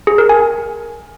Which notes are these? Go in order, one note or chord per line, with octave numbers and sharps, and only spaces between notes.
G#4
A#4
G#5